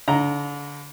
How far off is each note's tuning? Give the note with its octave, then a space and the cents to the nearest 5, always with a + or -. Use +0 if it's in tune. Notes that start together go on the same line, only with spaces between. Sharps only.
D3 -30 A#5 +0